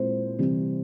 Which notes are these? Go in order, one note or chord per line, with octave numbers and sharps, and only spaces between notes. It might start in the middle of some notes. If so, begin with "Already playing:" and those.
Already playing: A#2 G#3 C4 E4 C5
C3 E3 G3